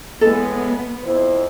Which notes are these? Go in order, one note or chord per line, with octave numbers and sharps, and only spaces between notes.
A2 E3 G#3 B3 A4
F2 E4 C5